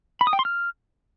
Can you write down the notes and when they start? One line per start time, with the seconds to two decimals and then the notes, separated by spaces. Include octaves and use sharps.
0.21 B5
0.27 D#6
0.33 G5
0.39 C6
0.45 F6